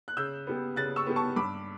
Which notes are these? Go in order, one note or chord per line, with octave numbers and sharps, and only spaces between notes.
F#6
C#3 E6 G6
G3 B3
C#3 F#6 A6
C#6 E6
G3 B3
A5 C#6
G2 B5 D6